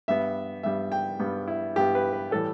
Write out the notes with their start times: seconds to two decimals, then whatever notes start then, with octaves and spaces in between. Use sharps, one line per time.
0.08 G2 G3 B3 E5
0.63 G2 G3 B3 E5
0.92 G5
1.19 G2 G3 B3
1.48 E4
1.76 G2 G3 B3 G4
1.95 B4
2.13 B4
2.31 A2 E3 G3 A4